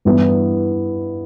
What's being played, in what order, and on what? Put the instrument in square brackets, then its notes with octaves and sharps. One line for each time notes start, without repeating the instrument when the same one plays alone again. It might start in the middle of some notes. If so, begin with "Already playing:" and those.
[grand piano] G2 E3 B3 E4